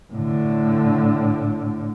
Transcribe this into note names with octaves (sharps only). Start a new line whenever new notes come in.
A2 D3